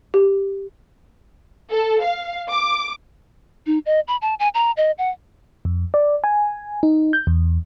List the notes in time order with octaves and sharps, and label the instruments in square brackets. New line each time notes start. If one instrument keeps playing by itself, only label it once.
[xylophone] G4
[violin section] A4
F5
D6
[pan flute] D#4
D#5
B5
A5
G#5
A#5
D#5
F#5
[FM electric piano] F2
D5
G#5
D#4
G6
E2